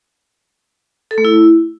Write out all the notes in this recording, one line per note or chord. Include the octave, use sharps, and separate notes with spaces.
A4
A3
E4